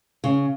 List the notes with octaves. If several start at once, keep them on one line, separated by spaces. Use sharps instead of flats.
C#3